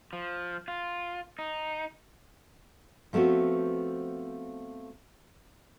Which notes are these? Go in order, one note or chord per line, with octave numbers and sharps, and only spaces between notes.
F3
F4
D#4
F3 A3 B3 C4 F#4